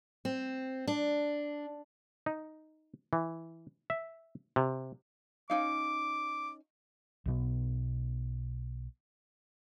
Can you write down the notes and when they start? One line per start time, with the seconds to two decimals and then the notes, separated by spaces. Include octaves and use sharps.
0.25 C4
0.87 D4
2.26 D#4
3.13 E3
3.90 E5
4.56 C3
5.50 C#4 D#4 F5 D6
7.26 B1 B2 B3